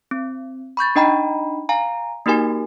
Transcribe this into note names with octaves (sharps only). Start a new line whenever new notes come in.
C4
B5 C#6 G6 A6
D4 D#4 D#5 G5 A#5 B5
F5 G#5 A#5
A#3 D#4 F#4 G4 A#4 G#5